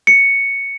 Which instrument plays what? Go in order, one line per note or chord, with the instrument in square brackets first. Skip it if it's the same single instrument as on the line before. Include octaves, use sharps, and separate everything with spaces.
[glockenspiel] C#7